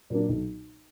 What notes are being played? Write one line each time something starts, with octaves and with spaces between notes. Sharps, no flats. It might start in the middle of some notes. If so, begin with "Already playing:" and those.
A#2 F#3 A#3 D4
B1